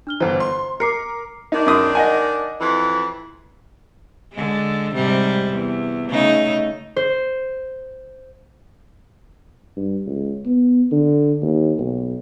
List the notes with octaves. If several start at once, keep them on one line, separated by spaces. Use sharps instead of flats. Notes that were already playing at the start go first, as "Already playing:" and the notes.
D4 F6 G7
G1 E3 C5 A#5
C6
A#4 D6 C7 C#7
D#3 D4 D#4
F#2 D#6
D#5 F#5 G#5
F2 E3
D3 G#3
G#2 C3 G3
E2
C#3 A3 D#4
C5
G2
C#2
B3
D3
D#2
B1